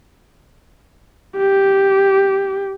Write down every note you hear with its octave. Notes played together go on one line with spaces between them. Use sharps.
G4